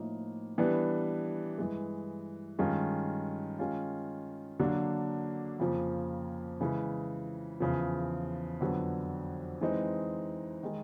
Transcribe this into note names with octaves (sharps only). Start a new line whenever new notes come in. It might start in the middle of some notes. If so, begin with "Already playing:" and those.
Already playing: A2 F3 A#3 D#4
E3 G3 B3 D4
G2 E3 G#3
G2 D#3 G#3 C#4 F4
D#3 G#3 C#4 F4
D3 F#3 A#3 D4
F2 C#3 F3 A#3
C#3 E3 G#3
E2 C#3 F3
F2 D3 F#3 B3
E3 G#3 C4 D#4
D#3 G#3